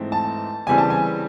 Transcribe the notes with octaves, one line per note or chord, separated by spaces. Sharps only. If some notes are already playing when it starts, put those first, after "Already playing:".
Already playing: G#2 E3 A3 C4
A5
C#3 E3 G3 C4 G#5
A5
G#5